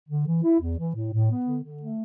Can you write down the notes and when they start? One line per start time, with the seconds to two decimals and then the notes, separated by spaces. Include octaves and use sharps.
0.09 D3
0.26 E3
0.43 E4
0.60 E2
0.78 E3
0.95 A2
1.13 A2
1.29 B3
1.46 D3
1.64 D3
1.81 A3